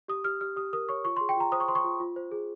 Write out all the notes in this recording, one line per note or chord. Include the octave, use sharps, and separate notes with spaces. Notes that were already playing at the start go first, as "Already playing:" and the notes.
G4 D#6
G4 F6
G4 F6
G4 D#6
A#4 D#6
C#5 C#6
F4 C#6
C6
G#4
G5
F4 A#5
C5 D#6
C#6
C5 C6
C#6
F4
F4
C5
G#4